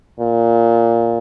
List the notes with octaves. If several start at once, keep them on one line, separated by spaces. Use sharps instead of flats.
A#2